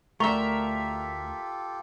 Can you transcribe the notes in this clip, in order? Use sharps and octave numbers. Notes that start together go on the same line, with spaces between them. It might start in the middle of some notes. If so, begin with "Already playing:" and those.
D2 A3 F4 G4 A4 A#4 E5 C#6